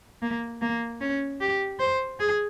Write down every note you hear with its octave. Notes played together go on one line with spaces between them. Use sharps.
A#3
A#3
C#4
G4
C5
G#4